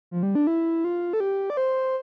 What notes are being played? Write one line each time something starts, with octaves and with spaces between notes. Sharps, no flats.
F3
G3
D4
E4
F4
A4
G4
D5
C5